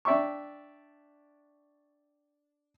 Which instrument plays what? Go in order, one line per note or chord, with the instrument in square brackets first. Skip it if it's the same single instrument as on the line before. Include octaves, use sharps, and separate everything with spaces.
[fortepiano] D4 D5 E5 G5 C#6